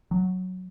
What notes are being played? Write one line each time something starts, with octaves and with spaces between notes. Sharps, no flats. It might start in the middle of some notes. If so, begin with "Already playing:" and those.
F#3